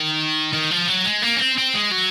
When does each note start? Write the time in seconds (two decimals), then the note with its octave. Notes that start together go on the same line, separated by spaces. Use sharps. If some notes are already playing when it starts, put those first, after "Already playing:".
Already playing: D#3
0.53 D#3
0.71 F3
0.88 F#3
1.06 G#3
1.23 A#3
1.37 C#4
1.40 C4
1.58 C4
1.75 G#3
1.92 F#3